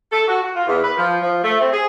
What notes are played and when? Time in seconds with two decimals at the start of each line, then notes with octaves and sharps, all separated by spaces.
0.11 A4
0.27 F#4
0.42 F#4
0.55 F4
0.66 E2
0.83 B4
0.97 F3
1.20 F3
1.43 A3
1.59 C4
1.71 G#4